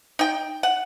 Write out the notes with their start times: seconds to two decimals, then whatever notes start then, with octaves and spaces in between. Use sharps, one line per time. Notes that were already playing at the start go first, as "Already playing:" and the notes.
0.19 D#4 G5
0.63 F#5